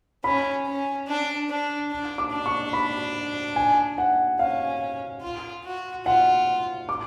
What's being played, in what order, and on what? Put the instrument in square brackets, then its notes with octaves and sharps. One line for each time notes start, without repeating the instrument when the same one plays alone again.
[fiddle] C#4 [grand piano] B5
[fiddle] C#4
D4
D4
D4
[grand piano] D6
[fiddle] D4
[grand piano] C#6
B5
G#5
F#5
[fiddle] C#4 [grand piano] F5
[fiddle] F4
F#4
[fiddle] F4 [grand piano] F#5
[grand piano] D6